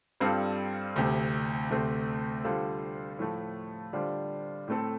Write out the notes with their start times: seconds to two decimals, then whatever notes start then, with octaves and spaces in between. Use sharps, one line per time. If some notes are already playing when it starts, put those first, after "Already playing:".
0.20 G2 G3 C4 F4 A4
0.96 D2 C3 A3
1.71 D2 C3 A3 C4
2.44 D3 G3 F4 A4 C5
3.19 A2 F3 A3
3.93 D3 G3 D4 F4 C5
4.68 A2 A3 C4 A4